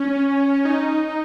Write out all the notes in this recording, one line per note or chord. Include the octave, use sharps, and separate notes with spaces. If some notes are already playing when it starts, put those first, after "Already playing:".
Already playing: C#4
D#4
D#4